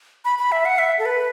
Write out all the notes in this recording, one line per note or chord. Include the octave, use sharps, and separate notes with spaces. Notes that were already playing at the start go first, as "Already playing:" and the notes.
B5
B5
E5
F#5
E5
A4
B4